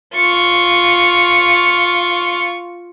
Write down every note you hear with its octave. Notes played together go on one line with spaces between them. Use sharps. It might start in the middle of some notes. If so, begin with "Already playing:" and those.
F4 C#6